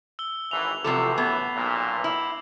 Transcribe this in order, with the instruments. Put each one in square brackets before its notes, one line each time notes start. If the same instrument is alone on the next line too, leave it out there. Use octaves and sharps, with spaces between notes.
[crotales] E6 G7
[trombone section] G#1 E3 [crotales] F7
[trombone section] F#2 A2 E3 [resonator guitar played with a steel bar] C3 F3 A4 [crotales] D6 C7
[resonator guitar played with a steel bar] B3 [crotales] G#6
[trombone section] B1 A#2
[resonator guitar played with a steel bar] E4 [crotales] F#7